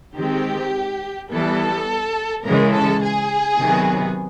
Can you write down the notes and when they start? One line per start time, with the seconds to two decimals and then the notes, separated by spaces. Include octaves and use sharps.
0.15 D#3 G#3 C4 G4
1.30 E3 G3 B3 A4
2.45 C#3 E3 G#3 A#4
2.73 A4
3.03 G#4
3.59 C3 D#3 F#3 B3